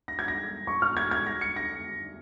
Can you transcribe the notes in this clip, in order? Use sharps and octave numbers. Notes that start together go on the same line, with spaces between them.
A#6
G#6
A#6
C#6
F6
G#6
G#6
A#6
C#7
A#6